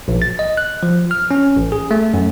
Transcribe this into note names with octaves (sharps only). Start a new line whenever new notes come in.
A#1
A6
D#5
F#6
F3
F6
C#4
A1
G#4
A3
F#2